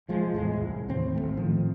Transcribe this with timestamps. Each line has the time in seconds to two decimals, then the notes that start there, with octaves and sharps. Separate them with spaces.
0.08 C2 F3 G#3
0.34 E2 A2 G#3
0.56 C2
0.88 D#2 A2 E3 C4
1.15 G#1 E2 A3
1.37 A2 D#3 F3 C4